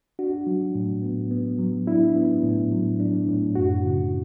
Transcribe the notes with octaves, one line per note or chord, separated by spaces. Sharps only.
D4 F#4
F#3
A2
B3
B3
F#3
D4 E4
B3
A2
F#3
D4
A2
F#2 F#4
C#3